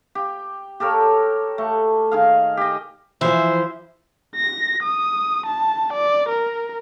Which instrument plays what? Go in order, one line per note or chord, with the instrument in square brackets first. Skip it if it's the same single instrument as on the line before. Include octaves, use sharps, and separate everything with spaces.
[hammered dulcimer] G4
G4 A4 A#4 C#5
A3
D#3 G#4 F5
G4 D#5
[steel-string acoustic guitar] E3 F3 [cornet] C5 [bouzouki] E5
[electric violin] A#6
D#6
A5
D5
A#4